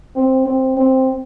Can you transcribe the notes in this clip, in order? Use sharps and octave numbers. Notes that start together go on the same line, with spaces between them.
C4
C4
C4